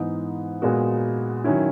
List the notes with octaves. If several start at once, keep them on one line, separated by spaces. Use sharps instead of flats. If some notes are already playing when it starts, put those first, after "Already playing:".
Already playing: G#2 E3 B3 D#4
A#2 G#3 B3 F#4
D#3 F#3 C#4 E4